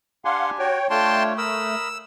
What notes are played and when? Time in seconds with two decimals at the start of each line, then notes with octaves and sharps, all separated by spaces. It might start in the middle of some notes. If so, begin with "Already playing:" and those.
0.25 D4 G4 F5 F#5 G#5 C6
0.59 F#4 C#5 G5
0.90 A3 D4 F4 C#5 G5 A5 C6
1.38 A#4 B5 D#6 E6